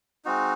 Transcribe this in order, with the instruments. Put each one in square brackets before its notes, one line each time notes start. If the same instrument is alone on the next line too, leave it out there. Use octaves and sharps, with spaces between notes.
[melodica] G#3 C4 D#4 F#4